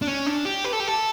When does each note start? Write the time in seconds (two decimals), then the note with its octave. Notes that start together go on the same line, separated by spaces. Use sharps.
0.02 D4
0.07 C#4
0.26 D4
0.45 G4
0.64 B4
0.73 A4
0.80 G4
0.87 A4